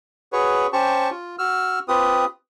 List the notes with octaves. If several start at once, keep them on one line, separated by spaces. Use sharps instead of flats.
F#4 G#4 B4 C#5
C#4 G4 C5 A5 C#6
F4
F#4 E6 F6
C4 F4 G4 B4 D#6